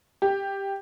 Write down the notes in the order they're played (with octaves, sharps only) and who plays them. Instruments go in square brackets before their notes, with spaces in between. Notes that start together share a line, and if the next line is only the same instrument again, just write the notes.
[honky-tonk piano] G4